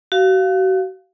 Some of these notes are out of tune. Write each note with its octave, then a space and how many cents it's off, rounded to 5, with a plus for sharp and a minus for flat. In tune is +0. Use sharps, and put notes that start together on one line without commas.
F#4 +35 F5 +0